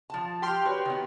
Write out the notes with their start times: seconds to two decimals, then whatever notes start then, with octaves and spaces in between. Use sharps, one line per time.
0.10 F3 A5
0.42 G4 G5 C6 F6
0.65 F#4 B4 C#5
0.85 D#3 B3